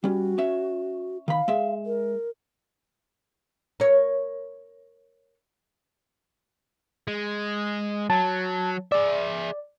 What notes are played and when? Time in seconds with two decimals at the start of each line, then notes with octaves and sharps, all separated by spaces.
0.04 G3 C#4 F#4
0.38 C#4 C#5 E5
1.28 D#3 F5 B5
1.48 G#3 E5
1.86 A#4
3.80 A#4 C#5
7.08 G#3
8.10 F#3 A5
8.92 G#4 D5 E5